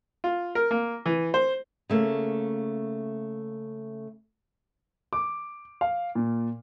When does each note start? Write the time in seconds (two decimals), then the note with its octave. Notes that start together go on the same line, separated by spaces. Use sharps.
0.24 F4
0.55 A#4
0.71 A#3
1.06 E3
1.34 C5
1.90 C#3 A3 A#3
5.13 D6
5.81 F5
6.15 A#2